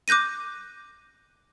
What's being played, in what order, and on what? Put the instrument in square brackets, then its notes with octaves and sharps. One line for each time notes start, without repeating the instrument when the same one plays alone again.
[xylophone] D6 F#6 G6 A#6 D#7